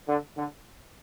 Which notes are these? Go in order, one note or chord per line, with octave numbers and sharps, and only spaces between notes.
D3
D3